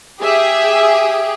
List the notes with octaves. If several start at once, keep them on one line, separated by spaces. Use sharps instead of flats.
G4 G#4 E5